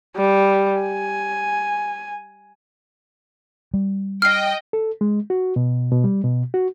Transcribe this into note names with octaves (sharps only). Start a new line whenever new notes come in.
G3
G#5
G3
D#5 G5 F6 C7
A4
G#3
F#4
B2
B2
G3
B2
F#4